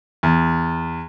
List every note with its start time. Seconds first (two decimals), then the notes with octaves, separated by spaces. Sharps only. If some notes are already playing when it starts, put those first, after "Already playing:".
0.23 E2